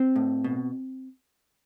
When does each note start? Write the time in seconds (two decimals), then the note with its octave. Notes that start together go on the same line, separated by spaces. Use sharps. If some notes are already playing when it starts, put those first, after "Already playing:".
Already playing: C4
0.16 A2
0.44 B2